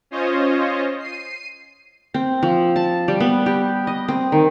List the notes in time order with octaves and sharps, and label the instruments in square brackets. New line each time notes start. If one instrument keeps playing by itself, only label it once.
[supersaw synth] C#4 F4 C5 C#5 D#5
C7 D#7
[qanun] C4
F3
A5
G3
B3
G4
D#5
C4
D#3